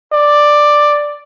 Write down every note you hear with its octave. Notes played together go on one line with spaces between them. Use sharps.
D5